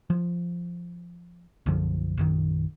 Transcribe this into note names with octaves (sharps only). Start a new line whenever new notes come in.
F3
B1 F#2 D3 F3
A#1 F#2 D#3